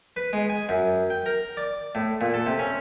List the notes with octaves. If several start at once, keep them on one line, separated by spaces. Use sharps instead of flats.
B4
G#3
G#5
F#2
G5
A#4
D5
A2
A#2
A4
C3
C#4